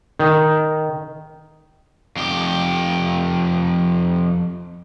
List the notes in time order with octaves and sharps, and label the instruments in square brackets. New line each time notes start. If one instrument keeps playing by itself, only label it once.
[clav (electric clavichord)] D#3
[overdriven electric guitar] F2 G4